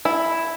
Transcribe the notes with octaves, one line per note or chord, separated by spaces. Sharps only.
E4